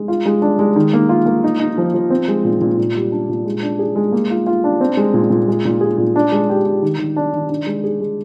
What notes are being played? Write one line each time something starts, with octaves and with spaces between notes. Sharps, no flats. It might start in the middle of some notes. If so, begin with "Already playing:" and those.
Already playing: G#3
F4
G#3
D4
G#3
D#3
A#3
F4
A#3
D#4
D#4
F3
F3
C4
G#3
A#2
A#2
A#2
G3
D4
A#2
G#3
D4
G#4
G#3
A#3
F4
F4
D4
C4
G#3
A#2
A#2
G#3
A#2
G#4
A#2
D4
G#3
G4
G4
D#3
D#3
D4
D#3
D4
G#3
G#4
G#3